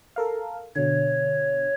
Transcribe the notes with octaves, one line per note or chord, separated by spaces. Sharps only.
A4 A#4 F5
B2 D3 C#5